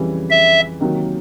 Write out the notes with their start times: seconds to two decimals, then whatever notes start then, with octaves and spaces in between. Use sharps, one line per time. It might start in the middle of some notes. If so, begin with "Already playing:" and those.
Already playing: F2 C#3 E3 G3
0.30 E5
0.80 C3 D#3 F#3 A#3